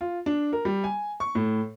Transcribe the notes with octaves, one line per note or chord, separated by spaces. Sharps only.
F4
D4
A#4
G3
G#5
C#6
A2